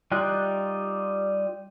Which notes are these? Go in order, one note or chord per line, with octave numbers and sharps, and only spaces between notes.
G3 D#4 F4 G5 F#6